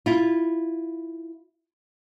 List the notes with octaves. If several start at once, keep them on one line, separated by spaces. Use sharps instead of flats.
E4 F4